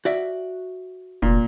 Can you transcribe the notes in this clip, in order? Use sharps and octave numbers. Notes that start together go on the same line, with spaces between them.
F#4 D5 E5
F1 A#2